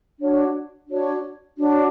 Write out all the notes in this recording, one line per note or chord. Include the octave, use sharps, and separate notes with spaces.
D4 F#4 C#5
D4 F#4 C#5
D4 F#4 C#5